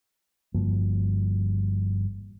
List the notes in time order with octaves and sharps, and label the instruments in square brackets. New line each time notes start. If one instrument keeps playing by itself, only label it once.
[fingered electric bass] G1 G2 F3 A#3